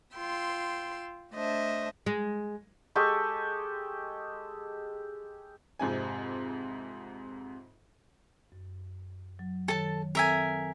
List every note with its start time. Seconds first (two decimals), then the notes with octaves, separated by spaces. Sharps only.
0.16 F4 G5 C6 E6
1.32 A3 D4 C5 D#5 E5
2.06 G#3
2.95 G#3 G4 A4 C#6
5.79 F2 G#2 C3 G#5
8.52 F#2
9.39 F#3
9.68 D#3 A4 C#5 A5
10.15 C4 A4 A#4 E5 G#5